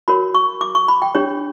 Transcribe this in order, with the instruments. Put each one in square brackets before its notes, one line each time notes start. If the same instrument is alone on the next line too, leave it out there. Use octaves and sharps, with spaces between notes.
[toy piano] F#4 A#4 C#5 B5
C#6
D6
C#6
B5
G5
D4 G4 C#5